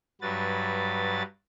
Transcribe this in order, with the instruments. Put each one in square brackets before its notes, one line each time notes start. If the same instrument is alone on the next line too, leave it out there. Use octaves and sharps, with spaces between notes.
[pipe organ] G2 F#3 B4 A6